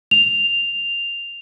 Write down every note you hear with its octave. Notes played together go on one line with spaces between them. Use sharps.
F7